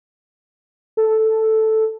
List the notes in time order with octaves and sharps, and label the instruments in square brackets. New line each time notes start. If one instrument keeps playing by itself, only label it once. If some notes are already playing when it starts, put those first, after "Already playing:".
[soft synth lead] A4